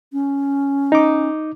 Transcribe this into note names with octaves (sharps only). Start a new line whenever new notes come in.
C#4
D#4 D6